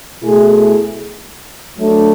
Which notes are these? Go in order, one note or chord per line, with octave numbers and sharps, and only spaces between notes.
B2 A3 E4 G#4
F#3 A3 D4 A4